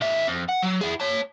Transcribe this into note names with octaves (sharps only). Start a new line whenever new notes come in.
D#3 E5
F2
F#5
F#3
E4 G#4
C#5 A5